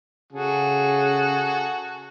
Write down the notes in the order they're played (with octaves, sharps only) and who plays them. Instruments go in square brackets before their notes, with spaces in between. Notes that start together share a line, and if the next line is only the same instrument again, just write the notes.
[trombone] C#3 [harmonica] F#4 G#4 A4